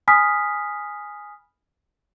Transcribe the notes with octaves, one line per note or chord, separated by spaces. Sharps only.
G#5 B5 D#6 F6 B6